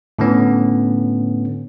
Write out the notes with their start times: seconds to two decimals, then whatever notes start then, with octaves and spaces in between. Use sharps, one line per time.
0.19 A2 D3 B3 C#4